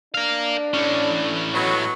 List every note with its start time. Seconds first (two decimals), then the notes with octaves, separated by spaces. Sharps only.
0.15 D4 A#4 F5
0.74 A2 C#4
1.54 B2 F#3